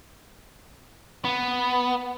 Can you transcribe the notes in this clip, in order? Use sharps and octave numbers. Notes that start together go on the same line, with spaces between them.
B3